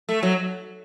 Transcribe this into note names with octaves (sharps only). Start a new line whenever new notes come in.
A3
F#3